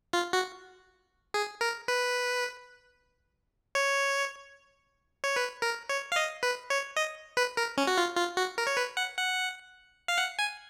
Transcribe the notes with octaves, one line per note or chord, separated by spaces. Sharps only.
F4
F#4
G#4
A#4
B4
C#5
C#5
B4
A#4
C#5
F5
D#5
B4
C#5
D#5
B4
A#4
C#4
F#4
F4
F4
F#4
A#4
C#5
B4
F#5
F#5
F5
F#5
G#5